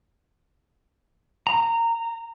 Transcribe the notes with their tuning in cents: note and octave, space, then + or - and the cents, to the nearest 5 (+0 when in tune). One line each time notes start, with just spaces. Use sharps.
A#5 -20